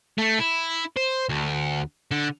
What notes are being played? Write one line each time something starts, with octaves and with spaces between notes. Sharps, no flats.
A3
E4
C5
D2
D3